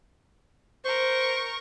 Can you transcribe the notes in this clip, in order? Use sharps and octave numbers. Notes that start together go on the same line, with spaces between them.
A#4 C5 C#6